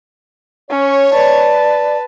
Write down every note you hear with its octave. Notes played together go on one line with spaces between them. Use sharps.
C#4 C#5
B4 D5 A5